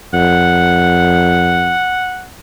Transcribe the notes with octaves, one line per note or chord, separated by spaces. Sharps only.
F2 F#5